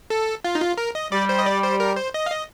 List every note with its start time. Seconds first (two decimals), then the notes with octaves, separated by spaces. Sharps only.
0.10 A4
0.44 F4
0.55 D#4
0.61 F4
0.78 A#4
0.95 D#5
1.12 G3 D5
1.29 C5
1.39 D#5
1.46 D5
1.63 C5
1.80 A#4
1.96 C5
2.14 D#5
2.26 F5
2.31 D#5